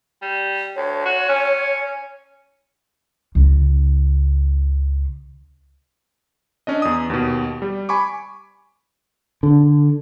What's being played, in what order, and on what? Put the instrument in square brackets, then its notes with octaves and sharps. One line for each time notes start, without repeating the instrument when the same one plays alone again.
[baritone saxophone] G3
[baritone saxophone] D2 [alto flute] C#5
[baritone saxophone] F#4
C#4
[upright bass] C#2 C#3
[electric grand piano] C#4 D4 D#5
E2 D#6
D#2 B2
G3
G#5 B5 C#6 D6
[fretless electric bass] D3